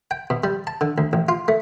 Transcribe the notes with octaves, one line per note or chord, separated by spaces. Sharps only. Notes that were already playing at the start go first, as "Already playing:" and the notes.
G5
B2
G3
A5
D3
D2
A1
F4
A3